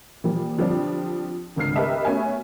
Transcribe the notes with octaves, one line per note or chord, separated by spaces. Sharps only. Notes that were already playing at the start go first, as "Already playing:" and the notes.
A#2 E3 F3 G3
D3 F3 G3 C4 D4
G#1 C#2 D3 F6 C7
G4 A#4 B4 D#5 E5
A3 B3 C#4 F#4 E5 G#5